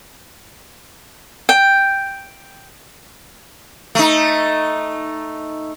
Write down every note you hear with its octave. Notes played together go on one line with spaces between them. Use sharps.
G5
A3 D#4